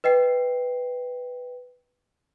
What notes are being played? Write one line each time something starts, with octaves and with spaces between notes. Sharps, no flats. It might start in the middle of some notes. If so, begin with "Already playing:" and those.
B4 D#5 G5 C7